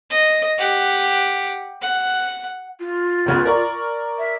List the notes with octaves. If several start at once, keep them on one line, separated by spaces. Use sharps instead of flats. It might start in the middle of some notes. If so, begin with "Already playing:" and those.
D#5
G4 F#5
F#5
F4
C#2 C#3 B3
A#4 D5 C#6
E5